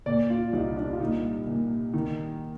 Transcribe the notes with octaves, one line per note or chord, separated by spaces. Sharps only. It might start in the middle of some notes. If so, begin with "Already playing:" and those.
A#2 D5
F4
C2 D#4
D4
F4
A#2 D#4
A#2
D#3